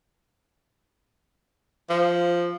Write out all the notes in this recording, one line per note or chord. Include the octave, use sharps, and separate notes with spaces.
F3